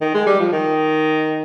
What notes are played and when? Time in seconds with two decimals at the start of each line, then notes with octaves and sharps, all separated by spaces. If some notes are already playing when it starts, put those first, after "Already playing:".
0.01 D#3
0.14 G#3
0.26 G3
0.40 F3
0.52 D#3